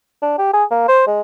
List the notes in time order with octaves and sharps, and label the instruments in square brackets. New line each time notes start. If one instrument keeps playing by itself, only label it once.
[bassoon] D4
G4
G#4
A#3
C5
G#3